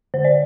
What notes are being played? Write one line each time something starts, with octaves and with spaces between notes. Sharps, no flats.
D3 C5
D5